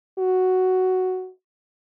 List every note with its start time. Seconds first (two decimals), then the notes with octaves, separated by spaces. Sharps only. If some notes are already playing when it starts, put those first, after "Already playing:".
0.19 F#4